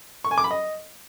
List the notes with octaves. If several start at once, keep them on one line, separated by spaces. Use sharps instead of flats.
C#6
G#5
D6
B5
D#5